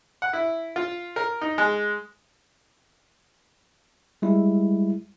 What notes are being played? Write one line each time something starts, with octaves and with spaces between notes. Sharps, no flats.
F#5
E4
F4
A#4
D#4
G#3
G3 G#3 E4